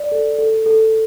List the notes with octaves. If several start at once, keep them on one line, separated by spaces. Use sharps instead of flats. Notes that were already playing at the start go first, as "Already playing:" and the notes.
Already playing: D5
A4
A4
A4